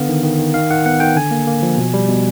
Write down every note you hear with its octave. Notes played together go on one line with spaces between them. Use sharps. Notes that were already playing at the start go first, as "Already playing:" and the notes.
Already playing: D3 B3 F5
D#3
D#3
D#3
D#3 F5
D#3 F#5
B3 F#5
D#3 G5
D3 G#5
A#3
A#3
F3
B2
G3
B2